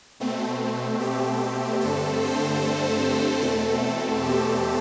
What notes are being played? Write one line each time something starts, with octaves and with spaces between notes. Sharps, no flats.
B2 A3 C4
G4
G4
G2 D3 A3 C4 A4
C5
C5
E2 B2 A3 C4 A4
G4